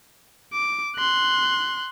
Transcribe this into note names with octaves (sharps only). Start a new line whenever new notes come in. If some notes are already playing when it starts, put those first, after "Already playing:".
D6
C6 F#6